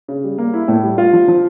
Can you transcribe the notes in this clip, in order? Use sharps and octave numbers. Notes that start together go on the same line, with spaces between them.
C#3
G3
A#3
E4
A2
G3
F4
F3
F3